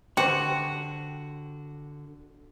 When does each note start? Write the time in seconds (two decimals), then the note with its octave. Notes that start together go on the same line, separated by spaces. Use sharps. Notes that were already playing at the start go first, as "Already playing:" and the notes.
0.17 D3 F#4 G4 C5